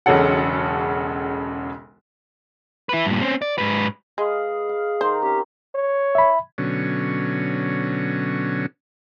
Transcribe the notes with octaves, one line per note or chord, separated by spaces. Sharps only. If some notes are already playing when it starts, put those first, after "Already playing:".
E1 B1 C#3 C#4 A4 F#5
E4 B4
G2 A#2
C4 C#4
D5
G#2 B4
G#3 G#4 B4 D#5 F5
F5
D#3 D#4 C5 A#5
C4 C#4 G4
C#5
E5 B5
B2 D3 F#3 C#4